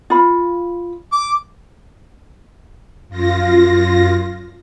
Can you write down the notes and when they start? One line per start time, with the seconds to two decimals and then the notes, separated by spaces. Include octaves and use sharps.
0.10 F4 B5
1.12 D6
3.09 F#2 F4 A#6